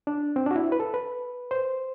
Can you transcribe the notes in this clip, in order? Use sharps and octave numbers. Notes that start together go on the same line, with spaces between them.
D4
C4
D4 F#4
E4
B4
A4
B4
C5